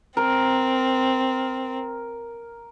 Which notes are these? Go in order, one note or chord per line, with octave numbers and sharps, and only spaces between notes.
C4 A#4